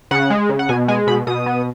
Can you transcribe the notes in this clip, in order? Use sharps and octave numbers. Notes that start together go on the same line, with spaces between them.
C#3 F#5
G#3
C#3
F#5
B2 G#5
G#3 G#5
B2 B5
B2 D#6
B3